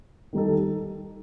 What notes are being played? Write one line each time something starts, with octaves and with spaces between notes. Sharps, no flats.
D#3 G3 D#4 A4